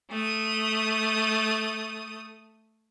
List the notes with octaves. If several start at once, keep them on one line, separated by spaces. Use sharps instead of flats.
A3 D#6